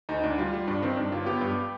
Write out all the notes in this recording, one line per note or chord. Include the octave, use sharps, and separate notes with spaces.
D2 D#4
D2 D4
G3 F4
G3
G2 D4
D#3 C4
G2 D4
G1 F4
B3 G4
G2